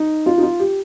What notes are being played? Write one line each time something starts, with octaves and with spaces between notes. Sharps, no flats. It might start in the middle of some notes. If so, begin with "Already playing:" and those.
Already playing: D#4
F4
D#4
F4
G4